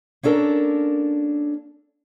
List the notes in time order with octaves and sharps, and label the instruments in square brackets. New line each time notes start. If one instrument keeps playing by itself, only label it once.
[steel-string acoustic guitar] A#3 C#4 D4 A4 A#4